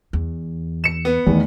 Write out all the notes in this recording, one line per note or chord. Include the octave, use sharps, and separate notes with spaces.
E2
C#7 E7
B3
E2 D#3 A3